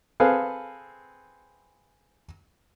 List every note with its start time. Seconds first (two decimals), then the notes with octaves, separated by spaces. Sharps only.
0.20 C4 G#4 A4 B4 F5